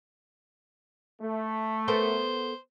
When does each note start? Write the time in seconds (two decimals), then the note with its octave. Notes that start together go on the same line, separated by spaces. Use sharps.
1.20 A3
1.88 B3 A4 A#4 C5